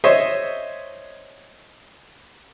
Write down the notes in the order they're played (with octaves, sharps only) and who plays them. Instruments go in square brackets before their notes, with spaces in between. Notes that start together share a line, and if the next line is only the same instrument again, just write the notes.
[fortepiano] C5 C#5 D#5 E5